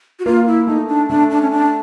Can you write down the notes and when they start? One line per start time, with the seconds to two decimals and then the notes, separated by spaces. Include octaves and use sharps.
0.20 F#4
0.26 A#3 F4
0.47 E4
0.67 A3 D#4
0.88 D4
1.09 A3 D4
1.30 D4
1.42 C#4
1.51 D4